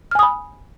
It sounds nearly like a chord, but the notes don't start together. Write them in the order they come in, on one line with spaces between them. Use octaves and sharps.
F6 G#5 D#6 B5